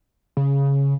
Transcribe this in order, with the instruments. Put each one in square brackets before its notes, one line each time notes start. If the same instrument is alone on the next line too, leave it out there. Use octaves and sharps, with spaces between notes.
[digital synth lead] C#3